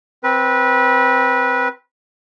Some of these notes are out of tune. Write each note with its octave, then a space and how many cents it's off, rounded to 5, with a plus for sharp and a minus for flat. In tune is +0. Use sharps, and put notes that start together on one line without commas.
C4 +0 B4 -20